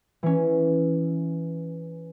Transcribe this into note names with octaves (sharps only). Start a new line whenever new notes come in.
E3 C#4